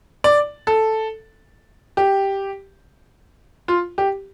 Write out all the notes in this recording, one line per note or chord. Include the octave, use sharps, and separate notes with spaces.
D5
A4
G4
F4
G4